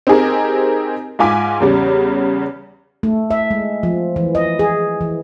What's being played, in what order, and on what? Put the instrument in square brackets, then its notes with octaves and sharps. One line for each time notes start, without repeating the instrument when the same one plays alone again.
[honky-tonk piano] C4 D#4 G4 G#4 A#4
G#2 F4 G#5 D6 B6
E2 C#3 G3
[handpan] A3
E5
G#3
F3
E3
D#5
G#4
E3